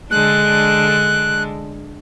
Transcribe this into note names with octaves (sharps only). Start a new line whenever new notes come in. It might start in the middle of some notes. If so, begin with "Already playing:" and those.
D3 G#3 D4 F#6